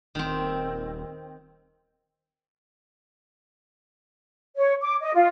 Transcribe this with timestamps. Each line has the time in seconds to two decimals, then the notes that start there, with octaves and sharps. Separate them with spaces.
0.15 D#1 D#3 C4
4.57 C#5
4.81 D6
5.01 D#5
5.14 F4